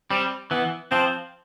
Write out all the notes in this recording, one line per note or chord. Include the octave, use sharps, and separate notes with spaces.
G3 C4
E3 B3
F3 C4